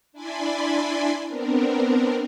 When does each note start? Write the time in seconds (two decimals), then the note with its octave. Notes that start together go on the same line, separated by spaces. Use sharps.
0.12 D4 E4 D5 G#5 B5 C6
1.27 B3 C4 D4 A#4